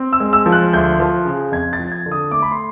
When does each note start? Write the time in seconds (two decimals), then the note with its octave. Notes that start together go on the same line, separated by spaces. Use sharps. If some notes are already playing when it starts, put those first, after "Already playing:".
Already playing: C4
0.13 E6
0.20 G#3
0.33 E6
0.46 F3
0.52 F#6
0.73 D2 G6
1.00 F3
1.25 C#3
1.52 F2 G#6
1.73 A6
1.79 F3
1.92 G#6
2.06 D3
2.12 D#6
2.31 A3 D6
2.42 B5
2.51 C6